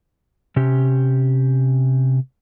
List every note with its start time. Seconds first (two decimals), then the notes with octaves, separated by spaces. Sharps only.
0.56 C3 C#4 G4